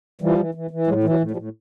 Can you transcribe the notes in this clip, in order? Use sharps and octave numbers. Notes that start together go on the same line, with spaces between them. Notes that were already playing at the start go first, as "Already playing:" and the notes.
E3 F3 G3
E3
E3
E3
A2 F#3 G#3
E3
F#3
A2
F3 G3
A2